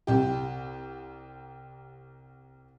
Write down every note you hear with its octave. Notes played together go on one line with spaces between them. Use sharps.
C2 G4